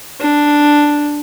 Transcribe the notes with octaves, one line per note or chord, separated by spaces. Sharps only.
D4